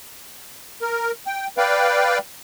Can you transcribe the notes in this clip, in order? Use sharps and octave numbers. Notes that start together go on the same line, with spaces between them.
A#4
G5
B4 D5 F5 G5